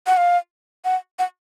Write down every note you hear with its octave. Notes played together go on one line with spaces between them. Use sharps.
F#5
F5
F#5
F#5